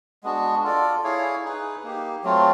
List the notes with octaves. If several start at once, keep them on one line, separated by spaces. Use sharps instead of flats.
G#3 B3 D4 F#4
F4 A4 D5
E4 G#4 C#5 F5
D#4 G#4 B4
A#3 D#4 G4
F#3 A3 C4 F4